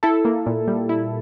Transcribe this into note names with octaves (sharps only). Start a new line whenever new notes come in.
E4 A4
A#3
A#2
G3
E4